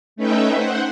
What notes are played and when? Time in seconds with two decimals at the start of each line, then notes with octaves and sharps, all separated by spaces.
0.16 A3 C#4 D#4 B4 E5 G5
0.55 C5 F#5